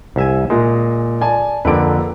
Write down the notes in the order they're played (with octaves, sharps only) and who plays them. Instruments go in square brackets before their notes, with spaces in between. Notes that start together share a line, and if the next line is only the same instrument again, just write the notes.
[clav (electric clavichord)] C2 E5 G#5
[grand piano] A#2 [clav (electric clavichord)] G#3
[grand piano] D5 G#5 A5
[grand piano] F2 A#3 D7 [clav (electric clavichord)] D3 B4